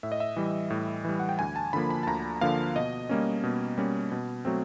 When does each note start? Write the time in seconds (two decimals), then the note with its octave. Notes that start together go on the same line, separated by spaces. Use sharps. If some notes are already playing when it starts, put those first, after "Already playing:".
0.03 A2 E5
0.12 D#5
0.20 E5
0.36 E3 G3
0.70 A2
1.05 E3 G3
1.20 F#5
1.29 G5
1.39 D2 G#5
1.56 A5
1.73 D3 F3 A#3 B5
1.90 B5
2.03 A5
2.07 D2 A#5
2.41 D3 F3 A#3 F5
2.76 B2 D#5
3.09 G3 A#3 C#4
3.44 B2
3.78 G3 A#3 C#4
4.12 B2
4.45 F#3 A3 C4